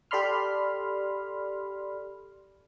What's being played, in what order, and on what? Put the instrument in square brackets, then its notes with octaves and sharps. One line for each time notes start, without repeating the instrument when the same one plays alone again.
[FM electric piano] G4 A4 D5 B5 C6 F6